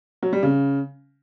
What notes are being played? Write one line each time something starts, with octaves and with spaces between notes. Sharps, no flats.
F#3
G3
C#3